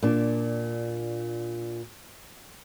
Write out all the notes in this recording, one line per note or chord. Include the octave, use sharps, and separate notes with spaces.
A#2 D4